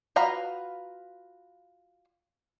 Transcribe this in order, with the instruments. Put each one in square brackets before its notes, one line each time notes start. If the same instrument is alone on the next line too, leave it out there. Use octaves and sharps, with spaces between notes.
[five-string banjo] F4 F#4 B4 F5 A#5